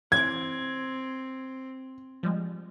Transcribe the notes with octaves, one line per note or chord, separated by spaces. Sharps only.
E3 C4 D6 G#6
F3 G3 G#3